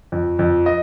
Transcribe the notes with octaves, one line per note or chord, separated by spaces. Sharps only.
F2
F2
D#5